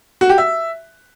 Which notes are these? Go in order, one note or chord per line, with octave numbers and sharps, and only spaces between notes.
F#4
G4
E5